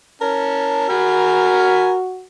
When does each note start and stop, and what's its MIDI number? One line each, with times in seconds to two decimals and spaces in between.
0.22 0.87 61
0.22 1.97 70
0.22 0.87 81
0.90 2.25 66
0.90 1.91 80
0.90 1.91 83
0.90 1.91 89